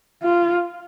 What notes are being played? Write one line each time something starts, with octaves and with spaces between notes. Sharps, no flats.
F4